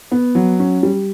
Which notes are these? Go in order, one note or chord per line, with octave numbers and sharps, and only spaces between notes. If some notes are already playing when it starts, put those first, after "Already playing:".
B3
F#3
C#4
G3